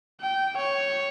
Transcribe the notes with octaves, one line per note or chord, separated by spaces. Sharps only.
G5
C#5